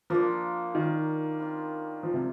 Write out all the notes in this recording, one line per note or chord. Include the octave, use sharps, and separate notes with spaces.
F3 A#3 D4 F4
D#3
G3 C4 F4
F3
C3